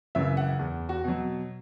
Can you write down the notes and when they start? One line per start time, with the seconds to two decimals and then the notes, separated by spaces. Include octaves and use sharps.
0.15 F#2 C#3 E3 E5
0.37 F#5
0.59 E2
0.89 F#4
1.04 B2 F#3